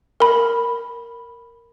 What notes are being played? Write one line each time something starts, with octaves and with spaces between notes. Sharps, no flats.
A#4 B5